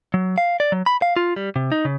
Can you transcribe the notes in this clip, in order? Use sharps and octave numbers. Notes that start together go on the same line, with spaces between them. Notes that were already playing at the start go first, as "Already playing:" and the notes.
F#3
F5
D5
F#3
B5
F5
F4
G3
C3
D#4
C#3